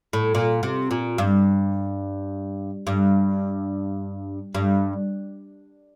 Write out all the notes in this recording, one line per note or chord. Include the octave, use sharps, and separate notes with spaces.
A2
A#2
C3
A#2
G2
G2
G2